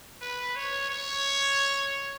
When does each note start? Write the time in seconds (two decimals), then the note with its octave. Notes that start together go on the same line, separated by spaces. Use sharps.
0.21 B4
0.56 C#5
0.90 C#5